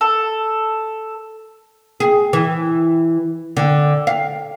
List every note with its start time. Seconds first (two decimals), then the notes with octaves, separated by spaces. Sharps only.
0.01 A4
2.00 G#4
2.33 E3
3.57 D3
4.07 F5